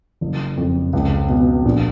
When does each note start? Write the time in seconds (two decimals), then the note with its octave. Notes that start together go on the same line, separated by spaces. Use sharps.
0.21 F#1
0.57 F2
0.93 C#2
1.29 B2
1.65 A#1